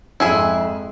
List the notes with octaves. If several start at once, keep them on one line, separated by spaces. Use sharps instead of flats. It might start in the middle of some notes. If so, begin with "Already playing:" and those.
F2 G#2 E4 G#4 E5